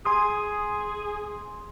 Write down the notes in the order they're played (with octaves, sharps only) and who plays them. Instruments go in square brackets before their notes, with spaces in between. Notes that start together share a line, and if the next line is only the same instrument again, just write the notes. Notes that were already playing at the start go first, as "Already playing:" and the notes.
[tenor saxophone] G#4 [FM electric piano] G#5 C6 D#6